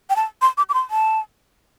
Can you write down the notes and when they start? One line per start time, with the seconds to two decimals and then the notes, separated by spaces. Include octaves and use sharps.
0.10 G5
0.16 A5
0.42 C6
0.58 D6
0.69 D6
0.74 C6
0.90 A5